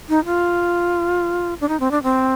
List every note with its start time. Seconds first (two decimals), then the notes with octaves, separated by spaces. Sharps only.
0.09 D#4
0.26 F4
1.61 D4
1.69 D#4
1.80 C4
1.91 D4
2.03 C4